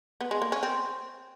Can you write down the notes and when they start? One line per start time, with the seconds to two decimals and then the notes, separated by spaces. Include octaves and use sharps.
0.21 B3
0.31 G#3
0.42 A#3
0.52 C#4
0.63 C4